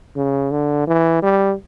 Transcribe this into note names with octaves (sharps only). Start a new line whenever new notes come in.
C#3
D3
E3
G3